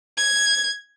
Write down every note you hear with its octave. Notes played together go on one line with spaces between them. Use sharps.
G#6